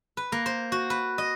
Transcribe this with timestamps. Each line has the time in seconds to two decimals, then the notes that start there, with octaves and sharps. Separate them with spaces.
0.17 B4
0.32 A#3
0.46 C5
0.72 F#4
0.90 B4
1.18 D#5